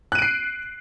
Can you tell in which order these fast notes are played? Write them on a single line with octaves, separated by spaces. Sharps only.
F#6 D#7 D7 C7